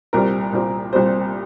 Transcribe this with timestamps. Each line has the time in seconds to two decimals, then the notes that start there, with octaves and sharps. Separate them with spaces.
0.13 C2 A#2 G3 C4 A#4
0.53 C2 A#2 G3 C4
0.93 C2 A#2 G3 C4 C5